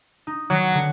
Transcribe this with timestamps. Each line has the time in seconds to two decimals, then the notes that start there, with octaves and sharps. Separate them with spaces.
0.27 D#4
0.50 D#3 F#3
0.72 D3 B3